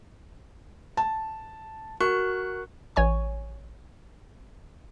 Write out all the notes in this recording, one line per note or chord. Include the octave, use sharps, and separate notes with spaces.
A5
F#4 A#4 C#6 F#6
A1 C#5 G#5 C#6